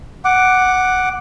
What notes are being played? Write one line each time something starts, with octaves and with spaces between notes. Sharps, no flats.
F#5 D6